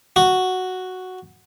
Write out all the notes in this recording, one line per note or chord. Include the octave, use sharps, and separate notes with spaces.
F#4